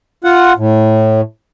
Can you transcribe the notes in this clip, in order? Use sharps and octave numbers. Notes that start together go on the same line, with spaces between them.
F4 F#5
A2